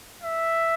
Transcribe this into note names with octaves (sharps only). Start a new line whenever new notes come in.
E5